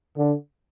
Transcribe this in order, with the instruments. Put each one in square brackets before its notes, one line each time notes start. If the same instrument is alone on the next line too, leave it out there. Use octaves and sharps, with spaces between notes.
[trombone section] D3